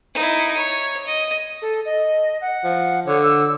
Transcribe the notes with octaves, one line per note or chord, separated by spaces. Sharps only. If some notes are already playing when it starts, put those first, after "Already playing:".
D#4 E4
C#5
D#5
A4
D#5
F#5
F3
D3 C#5
E6